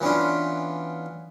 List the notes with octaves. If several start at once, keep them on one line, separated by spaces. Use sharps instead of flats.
E3 B3 C#4 D4 F4